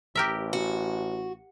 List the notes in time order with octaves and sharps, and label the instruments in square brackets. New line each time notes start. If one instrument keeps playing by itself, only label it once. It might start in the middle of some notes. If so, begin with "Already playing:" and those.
[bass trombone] A1 [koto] G4 A#4 E5
[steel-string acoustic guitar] F#4